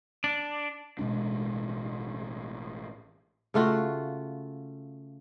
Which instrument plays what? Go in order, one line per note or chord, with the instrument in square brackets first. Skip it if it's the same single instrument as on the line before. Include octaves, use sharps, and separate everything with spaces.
[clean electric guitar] D4
[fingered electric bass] A1 B2 G#3 D4
[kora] C#3 A3 F4 F#4